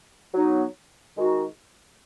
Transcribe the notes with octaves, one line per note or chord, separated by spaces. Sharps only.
F#3 B3 D#4
D#3 G#3 D#4 F#4